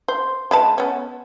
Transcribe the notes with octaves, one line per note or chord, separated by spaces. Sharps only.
C5
G#3 B4 A5
B3 C#4